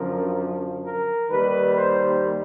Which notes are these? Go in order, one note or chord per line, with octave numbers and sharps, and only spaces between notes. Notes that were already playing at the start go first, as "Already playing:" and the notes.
Already playing: F#2 D3 F3 A#4
A#4
D#2 D#3 G3 B4
C5